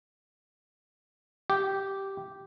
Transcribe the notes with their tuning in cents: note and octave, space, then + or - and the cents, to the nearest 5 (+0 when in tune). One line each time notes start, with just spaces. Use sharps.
G4 -10